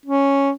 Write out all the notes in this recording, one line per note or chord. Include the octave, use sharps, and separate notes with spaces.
C#4